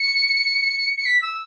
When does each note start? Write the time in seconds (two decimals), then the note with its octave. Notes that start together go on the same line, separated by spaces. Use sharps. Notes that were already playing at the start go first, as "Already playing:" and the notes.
Already playing: C#7
0.97 C#7
1.05 B6
1.22 E6